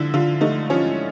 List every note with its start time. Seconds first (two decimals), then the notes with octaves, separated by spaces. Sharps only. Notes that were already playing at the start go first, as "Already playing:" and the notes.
Already playing: D3 F3 E4
0.14 D3 F4
0.41 A3 D#4
0.70 F3 C#4